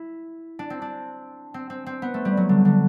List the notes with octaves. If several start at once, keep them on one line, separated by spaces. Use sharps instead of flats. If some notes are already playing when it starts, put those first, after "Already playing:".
Already playing: E4
D4
C4
D4
C4
C4
C4
B3
A3
G3
F#3
D3
D3